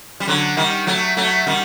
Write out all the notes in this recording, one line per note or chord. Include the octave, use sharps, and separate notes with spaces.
G3
D3 F#3
D#3 G3
F#3 A3
F#3 A3
D#3 G3